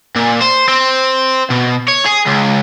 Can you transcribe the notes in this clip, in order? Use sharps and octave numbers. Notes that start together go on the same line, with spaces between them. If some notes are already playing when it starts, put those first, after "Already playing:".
A#2
C5
C4
B2
C#5
G#4
C#2